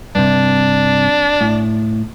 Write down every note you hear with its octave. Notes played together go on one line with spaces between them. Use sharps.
G2 C3 D4
A2